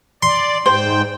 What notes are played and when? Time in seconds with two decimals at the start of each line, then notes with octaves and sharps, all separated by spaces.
0.23 D5 C6
0.66 G#2 C5 G5